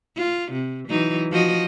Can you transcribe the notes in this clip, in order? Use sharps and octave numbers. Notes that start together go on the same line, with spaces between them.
F4
C3
E3 F#3 D#4
F3 F#4 D#5